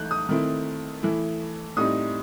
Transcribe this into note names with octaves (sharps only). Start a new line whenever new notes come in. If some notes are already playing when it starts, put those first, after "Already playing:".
Already playing: E3 A3 D#4 F#6 G6
D#6
D#3 A3 C4 E4
E3 A3 E4
A2 G3 C4 D#4 D#6